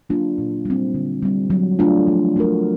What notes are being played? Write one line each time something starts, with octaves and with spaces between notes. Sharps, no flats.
F#3 A#3 D4 F4
A#2
G3 C4
D3
G3 C4
F#3
A3 D4 F4
F3
A3 D4 F#4 A#4